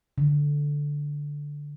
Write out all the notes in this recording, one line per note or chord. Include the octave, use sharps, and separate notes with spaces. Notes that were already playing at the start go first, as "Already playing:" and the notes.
D3